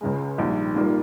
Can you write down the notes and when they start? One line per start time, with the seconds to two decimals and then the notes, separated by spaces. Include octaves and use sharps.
0.01 C#2 C#3 G#3
0.38 A#1 G#2 D#3 G3
0.75 G#1 G#2 G3 A#3 F4